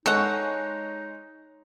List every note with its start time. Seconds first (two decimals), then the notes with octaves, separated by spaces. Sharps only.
0.06 G#3 D#4 A4 C#5 F#5 G#5